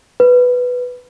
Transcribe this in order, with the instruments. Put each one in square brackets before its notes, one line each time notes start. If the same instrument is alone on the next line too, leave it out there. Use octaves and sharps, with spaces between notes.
[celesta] B4